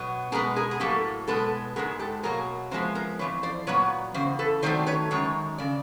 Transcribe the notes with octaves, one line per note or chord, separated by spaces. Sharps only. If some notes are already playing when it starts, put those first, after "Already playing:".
Already playing: B2 F#3 B3
B2 G#3 B3 G#4 A#4
G#4 A#4
G#4
A2 F#3 A#3 G4 A4
B2 G#3 B3 A4 B4
G#2 D#3 G#3 B3 G#4 A#4
G4 A4
B2 F#3 A#3 G#4 A#4
C3 F3 G#3 B3 A#4 C5
A#4 C5
F2 C#3 E3 B4 C#5
C5 D5
A#2 F#3 B3 B4 C#5
E2 C#3 C5
A4 B4
C3 D#3 F#3 A3 C5 D5
B4 C#5
F#2 D#3 G#3 C#5
C#3 D5